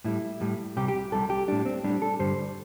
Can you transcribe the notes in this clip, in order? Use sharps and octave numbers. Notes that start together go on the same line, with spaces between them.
A2 G3 E4
A2 G3
C2 C3 G3 G4
G4
C2 C3 G3 A4
G4
A2 G3 D4
C4
A2 G3 D4
A4
G2 D3 G3 C5